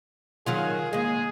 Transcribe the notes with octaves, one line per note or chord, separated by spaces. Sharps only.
D#3 F#3 F4 G#4
D#2 G#3 G#4